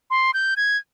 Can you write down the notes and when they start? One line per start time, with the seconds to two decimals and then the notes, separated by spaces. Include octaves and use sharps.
0.10 C6
0.34 G6
0.57 G#6